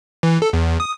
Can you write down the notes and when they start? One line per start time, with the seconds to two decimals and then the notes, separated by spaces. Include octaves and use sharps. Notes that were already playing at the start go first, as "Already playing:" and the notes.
0.23 E3
0.42 A4
0.53 E2
0.80 D#6